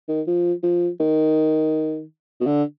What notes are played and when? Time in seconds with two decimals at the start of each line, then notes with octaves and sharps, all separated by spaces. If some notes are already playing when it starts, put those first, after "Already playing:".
0.08 D#3
0.27 F3
0.63 F3
1.00 D#3
2.40 B2
2.46 D3